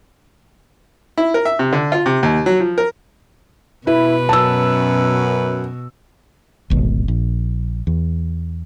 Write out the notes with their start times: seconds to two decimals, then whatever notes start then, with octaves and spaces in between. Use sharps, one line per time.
1.18 E4
1.34 A#4
1.45 E5
1.59 C3
1.73 D3
1.92 F4
2.06 C3
2.23 D#2
2.46 F#3
2.60 F3
2.78 A#4
3.87 B2 E4 B4
4.29 F#2 A5 E6
6.70 D1 G#1 B2
7.08 A#1
7.87 E2